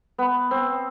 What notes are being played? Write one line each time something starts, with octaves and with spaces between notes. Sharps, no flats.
B3
C4